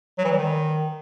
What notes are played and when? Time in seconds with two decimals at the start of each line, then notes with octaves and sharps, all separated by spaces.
0.18 F#3
0.25 E3
0.31 G3
0.37 D#3